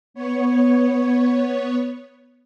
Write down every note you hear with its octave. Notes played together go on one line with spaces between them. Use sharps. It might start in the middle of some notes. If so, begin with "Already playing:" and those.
B3 C#5